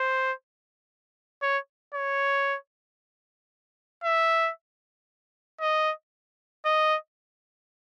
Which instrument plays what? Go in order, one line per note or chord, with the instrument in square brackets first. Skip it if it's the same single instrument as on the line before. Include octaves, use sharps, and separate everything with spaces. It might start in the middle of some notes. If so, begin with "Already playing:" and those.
Already playing: [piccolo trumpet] C5
C#5
C#5
E5
D#5
D#5